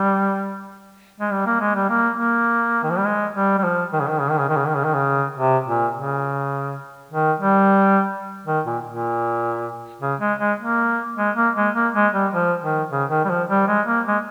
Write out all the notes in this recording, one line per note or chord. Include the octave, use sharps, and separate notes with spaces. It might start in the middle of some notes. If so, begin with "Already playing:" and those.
Already playing: G3
G#3
G3
A#3
G#3
G3
A#3
A#3
D#3
F3
G3
G#3
G3
G3
F3
D#3
C#3
D#3
C#3
D#3
C#3
D#3
C#3
D#3
C#3
D#3
C#3
C3
A#2
C#3
D#3
G3
D#3
A#2
A#2
C#3
G#3
G#3
A#3
G#3
A#3
G#3
A#3
G#3
G3
F3
D#3
C#3
D#3
G3
F3
G3
G#3
A#3
G#3